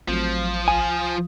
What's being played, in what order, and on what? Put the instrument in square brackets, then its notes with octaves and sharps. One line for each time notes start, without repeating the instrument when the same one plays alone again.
[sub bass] A1 [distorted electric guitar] F3 [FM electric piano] F#3 A3 C4
[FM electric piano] C2 F4 D#6 [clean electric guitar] G#5